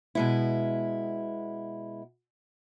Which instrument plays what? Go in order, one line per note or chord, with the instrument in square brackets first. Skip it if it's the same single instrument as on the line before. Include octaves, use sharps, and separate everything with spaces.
[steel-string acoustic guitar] B2 G#3 E4